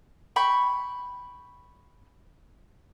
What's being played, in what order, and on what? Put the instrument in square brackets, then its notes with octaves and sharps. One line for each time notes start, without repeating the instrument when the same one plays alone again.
[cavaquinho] G5 B5 C#6